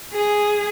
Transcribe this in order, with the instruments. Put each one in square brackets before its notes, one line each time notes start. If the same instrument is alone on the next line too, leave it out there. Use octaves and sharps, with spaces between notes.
[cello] G#4